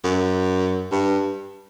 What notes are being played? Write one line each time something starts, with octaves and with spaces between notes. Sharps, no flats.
F#2
G2